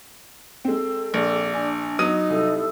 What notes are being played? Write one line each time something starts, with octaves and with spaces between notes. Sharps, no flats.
G#3 C4 A4
A#1 D5
D4 G#5
F#3 B3 D#4 D#6 D#7
C2 A4